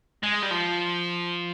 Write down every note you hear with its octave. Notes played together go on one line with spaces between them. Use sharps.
G#3
G3
F3